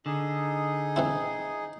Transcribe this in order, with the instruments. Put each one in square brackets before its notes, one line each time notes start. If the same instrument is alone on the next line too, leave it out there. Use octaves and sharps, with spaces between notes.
[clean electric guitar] D3 [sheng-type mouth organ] D#4 G#4
[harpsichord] E3 C4 E4